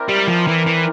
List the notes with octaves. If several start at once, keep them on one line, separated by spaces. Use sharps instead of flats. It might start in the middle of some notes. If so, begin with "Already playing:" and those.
Already playing: C4 E4 A#4 D5
G3
F3
E3
E3